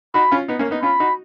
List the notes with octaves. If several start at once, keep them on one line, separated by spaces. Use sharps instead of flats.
D#4 F#4 B5
C#4 F4
B3 D#4
A#3 C#4
B3 D#4
C#4 F4 B5
D#4 F#4